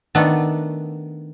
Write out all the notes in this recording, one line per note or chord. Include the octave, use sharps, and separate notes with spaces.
D#3 A3 B3 D4